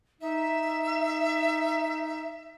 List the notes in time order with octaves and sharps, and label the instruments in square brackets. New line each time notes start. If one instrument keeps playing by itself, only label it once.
[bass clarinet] D#4 [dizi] E5